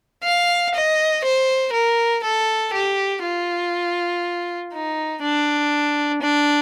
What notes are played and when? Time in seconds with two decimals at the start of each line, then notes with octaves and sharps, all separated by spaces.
0.23 F5
0.74 D#5
1.24 C5
1.73 A#4
2.23 A4
2.74 G4
3.23 F4
4.73 D#4
5.22 D4
6.22 D4